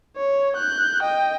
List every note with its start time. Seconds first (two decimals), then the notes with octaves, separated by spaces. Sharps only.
0.17 C#5
0.56 F#6 G6
1.02 D#5 G5